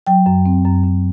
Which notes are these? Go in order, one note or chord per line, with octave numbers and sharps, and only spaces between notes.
F#3 G5
F#2
C4
F#2
F#2